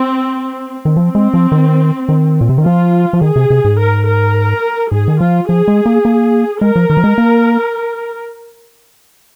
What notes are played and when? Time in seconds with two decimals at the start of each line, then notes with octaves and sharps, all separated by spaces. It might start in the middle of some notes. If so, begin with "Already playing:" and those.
Already playing: C4
0.85 D#3
0.96 F3 C4
1.15 G#3
1.34 F3
1.52 D#3
2.09 D#3
2.41 A#2
2.49 C3
2.58 D#3
2.65 F3 F4
3.13 F3
3.21 D#3 G#4
3.36 C3
3.50 C3
3.65 G#2
3.78 A#4
4.07 A#4
4.92 G#2 G#4
5.08 D#3
5.21 F3 F4
5.49 F3 G#4
5.68 G#3
5.86 A#3
6.05 A#3
6.61 G#3 A#4
6.76 F3
6.90 D#3
6.97 F3
7.04 G#3
7.18 A#3